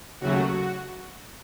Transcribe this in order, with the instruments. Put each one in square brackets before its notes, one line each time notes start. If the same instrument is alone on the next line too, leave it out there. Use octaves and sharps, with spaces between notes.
[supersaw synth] D#2 C#3 F#3 A3 F#4